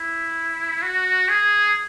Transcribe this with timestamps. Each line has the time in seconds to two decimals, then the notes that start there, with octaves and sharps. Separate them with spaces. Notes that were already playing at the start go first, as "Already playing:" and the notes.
Already playing: E4
0.82 F#4
1.29 G#4